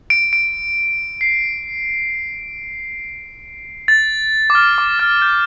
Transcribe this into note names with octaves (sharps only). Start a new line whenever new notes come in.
D7
D7
C7
A6
D6
F6
D6
F6
G6